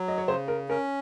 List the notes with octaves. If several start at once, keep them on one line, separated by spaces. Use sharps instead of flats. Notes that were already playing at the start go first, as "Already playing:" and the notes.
Already playing: F#3
D#5
C#5
C#3 C5
A#4
C#4 A#4